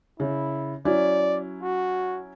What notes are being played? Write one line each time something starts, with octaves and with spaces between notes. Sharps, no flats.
C#3 E4
F#3 C#4 E4 D5
F#4